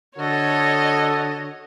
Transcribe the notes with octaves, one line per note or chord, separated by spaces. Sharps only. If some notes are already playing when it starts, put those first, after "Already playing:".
D3 F#4 A4 C#5 D#5